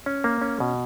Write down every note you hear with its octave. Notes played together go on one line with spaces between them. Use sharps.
C#4
A#3
C#4
B2